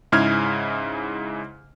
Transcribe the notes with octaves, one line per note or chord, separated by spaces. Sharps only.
G#2 C#3 E4 F6 G#6